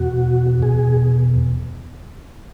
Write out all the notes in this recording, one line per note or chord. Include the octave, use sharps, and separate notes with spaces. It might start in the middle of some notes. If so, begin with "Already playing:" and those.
Already playing: E2 B2 F#4
E2 B2 G#4